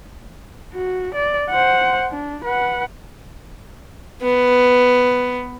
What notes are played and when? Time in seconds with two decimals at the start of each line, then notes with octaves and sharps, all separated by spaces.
0.73 F#4
1.14 D5
1.50 C5 F#5
2.10 D4
2.44 B4 F#5
4.22 B3